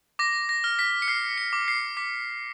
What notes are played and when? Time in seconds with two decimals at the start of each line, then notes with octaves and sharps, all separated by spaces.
0.19 D6 A#6
0.49 A#6
0.64 F6
0.79 B6
1.02 C#7
1.08 F6 C7
1.38 C#7
1.53 D6
1.68 C7
1.97 D6 B6